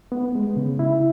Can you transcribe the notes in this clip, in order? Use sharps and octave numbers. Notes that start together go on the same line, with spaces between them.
B3
G#3
C#3
E4